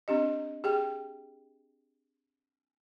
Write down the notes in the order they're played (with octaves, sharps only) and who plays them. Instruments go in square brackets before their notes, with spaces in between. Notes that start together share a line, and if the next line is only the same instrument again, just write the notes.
[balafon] C4 D4 G4 D#5
G4 G#4 G5